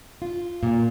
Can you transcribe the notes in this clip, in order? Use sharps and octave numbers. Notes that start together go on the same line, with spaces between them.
F4
A#2